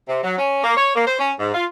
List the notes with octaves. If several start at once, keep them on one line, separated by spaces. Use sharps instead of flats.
C3
F#3
C#4
A#3
C#5
A#3
C5
C#4
G#2
F4